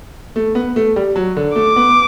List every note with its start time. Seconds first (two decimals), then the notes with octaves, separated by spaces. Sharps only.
0.36 A3
0.55 B3
0.76 A3
0.96 G3
1.16 F#3
1.36 D3
1.56 A3 D6
1.76 B3